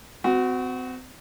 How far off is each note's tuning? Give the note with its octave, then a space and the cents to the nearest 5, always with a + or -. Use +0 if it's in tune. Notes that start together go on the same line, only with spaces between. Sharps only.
C4 -35 F#4 +0